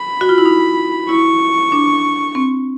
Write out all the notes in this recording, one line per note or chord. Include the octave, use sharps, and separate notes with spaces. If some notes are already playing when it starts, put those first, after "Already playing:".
Already playing: B5
F#4
F4
E4
D#4
E4 C#6
D4
C4